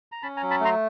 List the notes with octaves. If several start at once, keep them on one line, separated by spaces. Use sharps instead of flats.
A#5
C#4 A5 B5
G#5 A#5
F#3
A5 B5
A3 A#5 C6